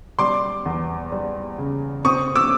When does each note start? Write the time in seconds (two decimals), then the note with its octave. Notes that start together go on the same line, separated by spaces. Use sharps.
0.19 G3 C6 D6
0.65 E2
1.12 G3
1.58 C#3
2.05 C4 C#6 D#6
2.36 D6 E6